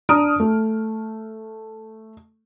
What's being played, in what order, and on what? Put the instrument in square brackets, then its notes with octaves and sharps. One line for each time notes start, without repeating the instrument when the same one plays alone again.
[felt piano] D4 A#5 D#6 F6 D7
A3